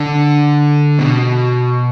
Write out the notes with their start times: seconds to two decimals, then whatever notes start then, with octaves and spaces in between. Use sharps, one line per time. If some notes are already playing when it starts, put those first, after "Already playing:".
Already playing: D3
0.99 B2